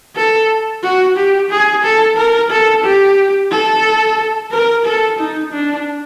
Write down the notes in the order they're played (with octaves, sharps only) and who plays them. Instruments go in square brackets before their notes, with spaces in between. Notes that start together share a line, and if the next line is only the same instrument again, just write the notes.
[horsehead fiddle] A4
F#4
G4
G#4
A4
A#4
A4
G4
A4
A#4
A4
D#4
D4